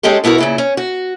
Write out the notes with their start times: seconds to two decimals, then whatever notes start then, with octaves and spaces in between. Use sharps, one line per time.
0.03 G#3 C#4 D#4 G4 A4
0.24 B2 B3 E4 F#4 A#4
0.38 A#2 C#3 E4
0.58 C#4
0.77 F#4